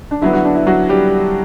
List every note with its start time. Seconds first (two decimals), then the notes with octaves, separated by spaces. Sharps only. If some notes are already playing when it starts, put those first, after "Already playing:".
0.11 D4
0.21 D3 F#3 B3 E4
0.33 F#3 F#4
0.45 D4
0.55 E4
0.67 F#3 F#4
0.89 G3 G4